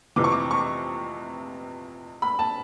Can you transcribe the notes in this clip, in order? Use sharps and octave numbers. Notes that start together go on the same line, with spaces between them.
F2 C3 E3 D6
C#6
D6
C#6
B5
A5